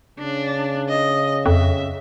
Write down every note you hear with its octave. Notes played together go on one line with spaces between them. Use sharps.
C#3 D4
D#5
F2 E5